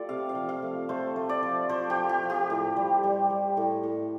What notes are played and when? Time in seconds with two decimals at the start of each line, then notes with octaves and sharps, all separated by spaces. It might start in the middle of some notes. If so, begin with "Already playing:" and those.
Already playing: A3 F4 G4 A4 D5
0.09 C3 F5
0.29 F5
0.35 F3
0.49 F5
0.62 A3
0.89 A3 C5
1.16 A3
1.29 D5
1.43 F3
1.69 F3 C5
1.90 G4
1.96 F3
2.09 G4
2.23 F3
2.30 G4
2.50 A2
2.76 G3
3.03 G3
3.30 G3
3.57 A2
3.83 A2